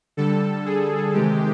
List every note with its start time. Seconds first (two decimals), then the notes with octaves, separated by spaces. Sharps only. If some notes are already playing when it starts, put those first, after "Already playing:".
0.17 D3 G3 A4
0.66 G#4
1.14 C3 D#3 G#3 G4